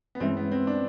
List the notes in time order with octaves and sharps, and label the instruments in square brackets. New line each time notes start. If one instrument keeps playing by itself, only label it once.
[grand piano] B3
[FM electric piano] G2 E3 G#3 C#4 E4 [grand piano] C4
[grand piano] B3
C4
D4